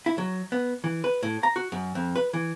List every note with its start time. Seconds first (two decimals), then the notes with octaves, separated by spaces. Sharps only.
0.06 E4
0.18 F#3
0.52 B3
0.84 E3
1.04 B4
1.23 A2
1.43 A#5
1.56 F#4
1.72 F#2
1.95 F2
2.16 B4
2.33 E3